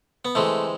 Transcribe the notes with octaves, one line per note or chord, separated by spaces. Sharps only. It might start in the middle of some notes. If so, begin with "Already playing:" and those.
B3
C3 E3 G#3 A3